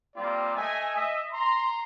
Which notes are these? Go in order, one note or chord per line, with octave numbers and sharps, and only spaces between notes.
G3 A#3 C4 F4 G4 D5
A3 D#5 E5 G#5
D#5 E5
A#5 C6